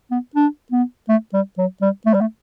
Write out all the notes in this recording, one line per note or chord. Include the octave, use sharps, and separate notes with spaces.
B3
D4
B3
A3
G3
F#3
G3
A3
G3
A3